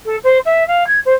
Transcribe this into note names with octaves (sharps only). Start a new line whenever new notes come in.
A4
C5
E5
F5
G#6
C5